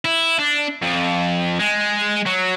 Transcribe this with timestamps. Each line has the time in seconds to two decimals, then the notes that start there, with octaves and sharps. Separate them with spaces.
0.05 E4
0.39 D4
0.82 F2
1.59 G#3
2.26 F#3